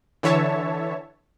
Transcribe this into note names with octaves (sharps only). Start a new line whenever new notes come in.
D3 E3 C#5 E5 A5